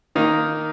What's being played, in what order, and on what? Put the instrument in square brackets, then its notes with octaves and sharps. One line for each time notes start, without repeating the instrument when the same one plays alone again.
[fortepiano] D#3 A#3 D#4